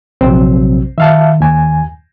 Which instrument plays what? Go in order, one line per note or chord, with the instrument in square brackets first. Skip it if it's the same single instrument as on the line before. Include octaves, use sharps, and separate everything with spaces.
[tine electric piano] A#1 C3 F#3 [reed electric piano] C4
[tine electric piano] D#3 [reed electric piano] E5 F5 A5
[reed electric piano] D#2 G#5